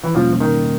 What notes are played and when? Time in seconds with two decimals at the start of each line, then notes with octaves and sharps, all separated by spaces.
0.04 E3
0.15 E2 B2 F3 G3 A#3 C#4
0.40 D#3